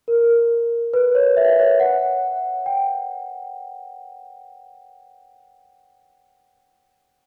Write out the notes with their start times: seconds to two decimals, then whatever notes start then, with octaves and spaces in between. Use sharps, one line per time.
0.08 A#4
0.94 B4
1.15 C#5
1.37 E5
1.59 C#5
1.80 F#5
2.66 G5